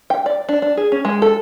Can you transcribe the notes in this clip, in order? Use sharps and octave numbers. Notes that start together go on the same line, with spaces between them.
G5
D5
D4
D4
G#4
C#4
G#3
A4